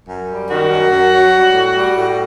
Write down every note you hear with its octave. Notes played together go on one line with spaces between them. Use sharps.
F#2
G3
D#3 F#4
F#2
F#2
F#3
G3
A2
G3
A2